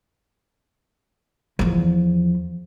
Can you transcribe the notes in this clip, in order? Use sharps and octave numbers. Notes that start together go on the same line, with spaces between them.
E2 F3